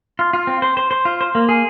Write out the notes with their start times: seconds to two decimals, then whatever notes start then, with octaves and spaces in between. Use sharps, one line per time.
0.19 F4
0.33 F4
0.47 C4
0.62 C5
0.77 C5
0.91 C5
1.05 F4
1.21 C5
1.35 A#3
1.49 G#4